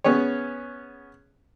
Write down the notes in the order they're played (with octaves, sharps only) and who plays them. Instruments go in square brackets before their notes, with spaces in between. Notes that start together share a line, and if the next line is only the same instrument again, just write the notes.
[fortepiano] B3 C#4 G#4 C#5